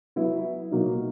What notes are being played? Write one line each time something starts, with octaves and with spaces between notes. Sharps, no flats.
F#3 B3 E4
B2 F#3 A#3 D#4